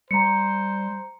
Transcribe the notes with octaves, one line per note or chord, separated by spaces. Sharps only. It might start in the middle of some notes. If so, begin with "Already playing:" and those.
G3 C5 A#5 C#7